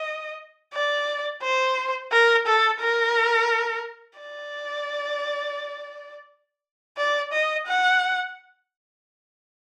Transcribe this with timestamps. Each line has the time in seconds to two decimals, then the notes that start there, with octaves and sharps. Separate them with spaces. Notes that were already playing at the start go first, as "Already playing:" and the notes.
Already playing: D#5
0.74 D5
1.43 C5
2.12 A#4
2.46 A4
2.80 A#4
4.19 D5
6.97 D5
7.32 D#5
7.67 F#5